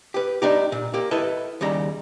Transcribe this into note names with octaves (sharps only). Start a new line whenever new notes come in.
G4 B4
D4 D#4 G4
A#2
A#3 G4
E4 A4 B4 D#5
D#2 C#3 G3 A#5